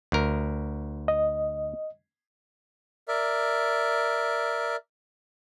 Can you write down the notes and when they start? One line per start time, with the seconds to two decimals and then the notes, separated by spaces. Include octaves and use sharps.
0.12 D2 A#4
1.08 D#5
3.08 A#4 D5 E5